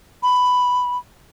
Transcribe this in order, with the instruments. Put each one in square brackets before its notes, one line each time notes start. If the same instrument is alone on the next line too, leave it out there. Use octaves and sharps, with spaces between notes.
[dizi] B5